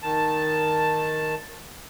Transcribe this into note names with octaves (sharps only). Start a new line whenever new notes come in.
D#3 A5